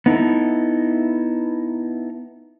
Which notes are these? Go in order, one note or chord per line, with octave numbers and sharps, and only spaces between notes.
B3 D#4 E4 A4